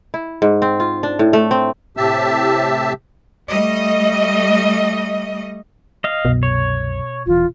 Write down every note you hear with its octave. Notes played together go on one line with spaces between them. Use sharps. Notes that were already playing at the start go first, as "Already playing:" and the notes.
E4
G#2
C4
F4
D4
A2
A3
C4
A2 C3 G4 E5 A5 E6
G3 A3 D#5
D#5 F5
C2 F#2 B2
C#5
D#1 E3 F4